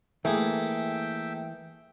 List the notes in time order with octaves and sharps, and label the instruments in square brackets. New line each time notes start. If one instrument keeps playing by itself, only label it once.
[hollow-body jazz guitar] E3 [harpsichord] A3 A#3 G#4 [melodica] E5 G5